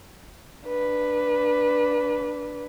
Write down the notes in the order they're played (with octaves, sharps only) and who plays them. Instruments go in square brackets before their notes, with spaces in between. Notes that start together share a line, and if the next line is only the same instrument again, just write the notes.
[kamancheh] D4 B4